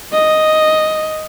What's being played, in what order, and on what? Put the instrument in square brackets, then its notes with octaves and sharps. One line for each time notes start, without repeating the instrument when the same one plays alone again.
[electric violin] D#5